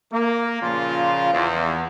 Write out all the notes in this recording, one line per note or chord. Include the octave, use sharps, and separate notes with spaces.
A#3
A#2 C#3 F3 F4
E2